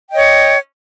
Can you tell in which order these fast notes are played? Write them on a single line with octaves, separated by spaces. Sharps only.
G5 D#5 C#5